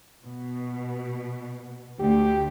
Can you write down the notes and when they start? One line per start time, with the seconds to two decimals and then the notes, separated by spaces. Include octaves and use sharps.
0.24 B2
2.00 D2 G4